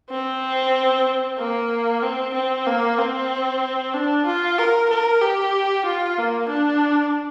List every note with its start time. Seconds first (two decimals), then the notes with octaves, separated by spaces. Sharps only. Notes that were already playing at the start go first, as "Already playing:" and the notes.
0.10 C4
1.38 A#3
2.03 C4
2.34 C4
2.67 A#3
2.98 C4
3.94 D4
4.26 F4
4.58 A#4
4.90 A#4
5.22 G4
5.85 F4
6.18 A#3
6.49 D4